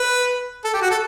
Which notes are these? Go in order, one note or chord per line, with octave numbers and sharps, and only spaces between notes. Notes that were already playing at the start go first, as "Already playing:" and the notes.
Already playing: B4
A4
G4
F#4
A4